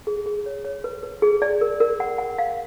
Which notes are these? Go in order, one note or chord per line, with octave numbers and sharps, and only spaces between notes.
G#4
G#4
C#5
C#5
B4
B4
G#4
D5
A#4
A#4
F#5
F#5
F5